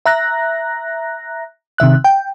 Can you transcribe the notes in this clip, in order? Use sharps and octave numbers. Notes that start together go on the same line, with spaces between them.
E5 A#5 F#6 A#6
C3 D#3 E5 F#6
G5